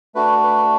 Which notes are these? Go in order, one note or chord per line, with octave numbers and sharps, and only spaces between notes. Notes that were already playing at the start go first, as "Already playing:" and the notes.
A3 D4 F#4 B4
B4